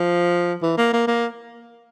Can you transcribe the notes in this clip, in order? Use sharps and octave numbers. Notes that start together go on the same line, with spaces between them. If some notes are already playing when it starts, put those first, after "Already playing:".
Already playing: F3
E3
A#3
A#3
A#3